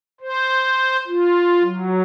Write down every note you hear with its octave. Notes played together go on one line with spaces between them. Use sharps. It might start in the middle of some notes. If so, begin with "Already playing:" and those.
C5
F4
F#3